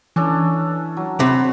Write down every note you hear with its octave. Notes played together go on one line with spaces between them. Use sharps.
E3 C#4 D4 A4
F#3
C3 F#4 B5